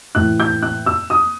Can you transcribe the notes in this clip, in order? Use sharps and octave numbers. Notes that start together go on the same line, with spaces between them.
A2 E3 F#6
G6
F#6
E6
D#6